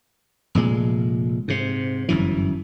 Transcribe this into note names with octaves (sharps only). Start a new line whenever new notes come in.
F1 A#2 G#3
G#2 C3
G1 F#2 E3